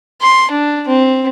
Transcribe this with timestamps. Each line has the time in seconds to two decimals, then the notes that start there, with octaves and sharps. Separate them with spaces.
0.22 C6
0.51 D4
0.88 C4